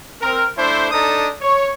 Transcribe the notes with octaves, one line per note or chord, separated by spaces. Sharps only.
C4 A#4
A3 D4 E4 C5
D4 D#4 A4 A#5 D#6
C#5